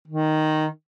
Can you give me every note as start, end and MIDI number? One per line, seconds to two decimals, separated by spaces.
0.07 0.67 51